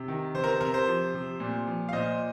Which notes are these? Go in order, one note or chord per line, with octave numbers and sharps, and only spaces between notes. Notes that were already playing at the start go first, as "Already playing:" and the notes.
Already playing: C3
D#3
C3 C5
A#4
C5
C3 A#4
C5
F3
C3
A#2
F3
F5
A#2 C5 D#5